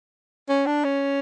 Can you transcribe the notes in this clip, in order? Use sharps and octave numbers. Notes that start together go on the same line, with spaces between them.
C#4
D4
C#4